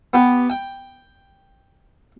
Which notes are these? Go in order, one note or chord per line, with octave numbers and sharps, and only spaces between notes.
B3 G4
G5